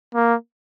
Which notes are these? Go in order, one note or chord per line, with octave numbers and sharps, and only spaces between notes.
A#3